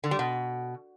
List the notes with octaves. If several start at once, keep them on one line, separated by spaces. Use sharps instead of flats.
D3
G3
B2